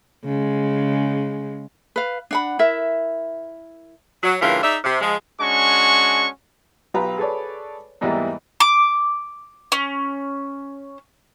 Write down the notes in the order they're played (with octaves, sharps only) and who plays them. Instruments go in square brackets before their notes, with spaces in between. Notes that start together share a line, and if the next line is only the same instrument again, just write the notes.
[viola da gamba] C#3 G#3
[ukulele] B4 F5
D4 F#5 B5
E4 A#4 E5
[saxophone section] F#3
G2 C#3 E3 A#3 F4
D#4 G#4 D5 E5
C3
F3 G#3
[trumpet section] G#3 C#4 D4 F#4 C#6
[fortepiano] B1 F4 G4 B4 A#5
G#4 A4 B4 C#5 D5
E2 G#2 E3 G3 A#3 E4
[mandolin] D6
C#4